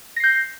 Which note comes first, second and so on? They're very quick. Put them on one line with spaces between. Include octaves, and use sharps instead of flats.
A#6 C7 G6